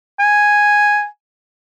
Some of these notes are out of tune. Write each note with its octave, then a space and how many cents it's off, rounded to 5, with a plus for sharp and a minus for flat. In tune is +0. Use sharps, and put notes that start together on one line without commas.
G#5 +0